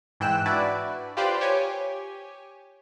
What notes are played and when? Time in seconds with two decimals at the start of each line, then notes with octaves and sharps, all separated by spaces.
0.20 G#2 E3 G5 E6 F#6 E7
0.46 D4 E4 F#4 B4 D5
1.17 F4 G4 B4 C5 D5
1.41 G4 C#5 G#5